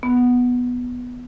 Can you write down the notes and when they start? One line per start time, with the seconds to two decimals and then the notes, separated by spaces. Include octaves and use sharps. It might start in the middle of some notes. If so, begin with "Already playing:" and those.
0.03 B3